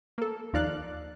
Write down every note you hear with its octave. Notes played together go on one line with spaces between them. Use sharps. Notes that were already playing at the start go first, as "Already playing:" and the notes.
A#3 A4
D#2 F3 D#4 D5 F5 F#6